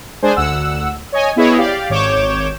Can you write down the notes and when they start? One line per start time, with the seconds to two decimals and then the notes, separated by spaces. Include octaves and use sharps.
0.22 G#3 D4 C5 G#5
0.36 D2 F#5 E6
1.12 C#5 D#5 G#5
1.36 B3 E4 G#4 B4 C#5 D#5
1.58 G4 D5 F5
1.89 G#1 C#5 D6 G6 E7